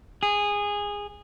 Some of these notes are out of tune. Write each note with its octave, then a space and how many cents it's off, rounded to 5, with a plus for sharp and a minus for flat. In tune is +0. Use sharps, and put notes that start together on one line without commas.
G#4 -15